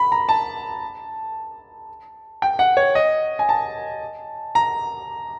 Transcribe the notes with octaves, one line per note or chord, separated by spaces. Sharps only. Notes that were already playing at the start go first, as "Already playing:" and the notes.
Already playing: B5
A#5
A5
G5
F#5
C#5
D#5
G#5
A5
A#5